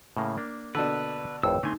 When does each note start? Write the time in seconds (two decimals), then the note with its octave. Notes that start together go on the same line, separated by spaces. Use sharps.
0.17 A2 C#3 A#3
0.37 A#3 D4
0.75 B2 D3 B4 D5 A5 E6
1.43 G#1 F2 A2 B4 C#5 G5 E6
1.63 D3 A3 B3 C4 D#4 G#5 C6